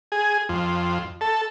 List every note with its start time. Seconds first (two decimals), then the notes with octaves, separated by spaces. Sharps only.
0.12 G#4
0.49 F2
1.21 A4